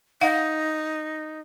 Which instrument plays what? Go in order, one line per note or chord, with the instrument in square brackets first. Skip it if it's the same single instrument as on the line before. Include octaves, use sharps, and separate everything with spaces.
[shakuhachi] D#4 [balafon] F5 F#5